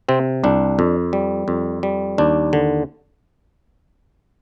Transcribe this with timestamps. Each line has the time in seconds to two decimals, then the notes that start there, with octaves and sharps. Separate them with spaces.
0.09 C3 C4
0.44 C2 D4
0.79 F2
1.13 G3
1.48 F2
1.83 G3
2.18 D#2 D4
2.53 D3